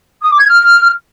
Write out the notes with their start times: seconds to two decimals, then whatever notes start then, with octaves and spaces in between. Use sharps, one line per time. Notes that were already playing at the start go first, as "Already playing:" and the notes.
0.22 D#6
0.31 D6
0.40 G#6
0.48 F6